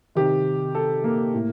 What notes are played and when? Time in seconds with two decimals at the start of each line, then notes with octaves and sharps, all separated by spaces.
0.15 C3 D#3 G4
0.75 A4
1.04 A#3
1.34 A2